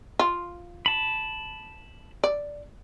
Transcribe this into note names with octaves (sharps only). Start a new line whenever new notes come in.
F4
A5 B5
D5